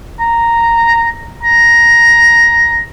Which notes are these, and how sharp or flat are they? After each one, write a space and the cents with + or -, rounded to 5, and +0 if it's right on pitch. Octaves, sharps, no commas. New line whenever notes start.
A#5 -5
A#5 +5